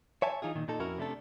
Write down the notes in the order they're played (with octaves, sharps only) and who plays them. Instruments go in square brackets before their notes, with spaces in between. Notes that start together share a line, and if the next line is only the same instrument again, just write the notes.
[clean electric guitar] C#5 E5 G#5 A5
E3 D#4 F4 G#4
A#2 D#3
A#2 D#4 A4
F2 C#4 E4 F#4 A#4
C3 A3 D4 A4